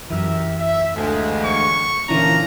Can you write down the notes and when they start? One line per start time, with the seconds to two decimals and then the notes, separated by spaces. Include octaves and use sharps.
0.10 F#2 E3 G4 A#4 E5
0.59 E5
0.96 D2 F3 G#3
1.45 C#6
2.09 A#2 D3 E3 F3 C#4 D4 A#5